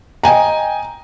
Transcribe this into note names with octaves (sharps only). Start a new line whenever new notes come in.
D#5 G5 G#5 A#5